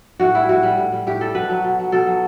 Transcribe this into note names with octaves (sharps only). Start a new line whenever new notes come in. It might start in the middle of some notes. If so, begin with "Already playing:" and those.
A2 F#4
G3 E4
A2 F#4
G3
A2
G3
A2 G4
G3 A4
B2 B4
F#3
B2
F#3
B2 A4
F#3